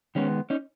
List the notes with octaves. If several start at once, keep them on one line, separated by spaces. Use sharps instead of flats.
D#3 G#3 B3 C#4
C#4 D#4